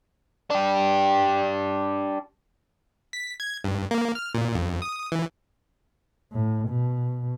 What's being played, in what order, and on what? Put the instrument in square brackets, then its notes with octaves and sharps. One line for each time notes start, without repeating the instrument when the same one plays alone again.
[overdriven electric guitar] D4 G4
[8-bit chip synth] B6
G#6
G2
A#3
F6
A#2
F2
D#6
E3
[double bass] A2
B2